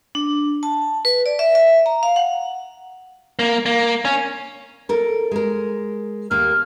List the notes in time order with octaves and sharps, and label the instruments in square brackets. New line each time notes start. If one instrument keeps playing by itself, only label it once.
[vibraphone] D4
A5
B4
D5
E5
E5
A#5
F5
F#5
[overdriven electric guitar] A#3
A#3
C#4
[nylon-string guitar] A4 A#4
G#3 A#4
[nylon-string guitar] D#2 A#3 [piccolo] F6